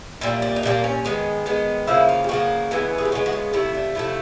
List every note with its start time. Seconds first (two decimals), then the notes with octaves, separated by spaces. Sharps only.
0.21 A#2 G3 A#3 E4
0.42 D4
0.56 D#4
0.63 A#2 G3 A#3 D4
0.84 C#4
1.04 D#3 G#3 B3
1.46 D#3 G#3 B3
1.87 C#3 F3 A#3 E4
2.09 F4
2.24 G4
2.29 C#3 F3 A#3 F#4
2.71 C#3 E3 G#3 B3
2.98 G#4
3.05 G4
3.12 C#3 E3 G#3 B3 F#4
3.26 F#4
3.33 F4
3.53 C3 F3 A3 E4
3.74 D4
3.95 C3 F3 A3 E4